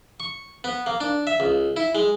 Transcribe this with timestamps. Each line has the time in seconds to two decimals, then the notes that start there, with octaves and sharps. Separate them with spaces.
0.20 C#6
0.64 B3
0.86 A#3
1.00 D4
1.27 E5
1.40 C#2
1.76 E4
1.95 G#3